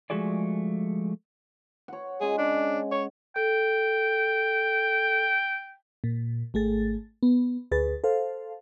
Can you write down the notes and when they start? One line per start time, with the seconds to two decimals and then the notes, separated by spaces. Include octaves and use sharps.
0.10 F3 G#3 A3 F#4 G#4 D5
1.88 C#5 F#5
2.21 G#3 C#4 G#4
2.38 D4
2.92 C#5
3.36 A4 G5
6.04 A#2
6.54 G#1 A3 G#4 A6
7.23 B3
7.71 D2 G#4 B4 A6
8.04 A4 C5 F5